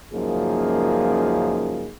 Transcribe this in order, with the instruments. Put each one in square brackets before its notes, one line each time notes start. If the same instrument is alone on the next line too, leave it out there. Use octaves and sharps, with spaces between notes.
[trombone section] C#2 F#2 F3 A#3 D#4 G#4